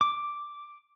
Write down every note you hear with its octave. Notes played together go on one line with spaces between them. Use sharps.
D6